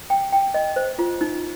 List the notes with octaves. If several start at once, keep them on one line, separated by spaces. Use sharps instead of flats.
G5
G5
D#5
C5
F4
D#4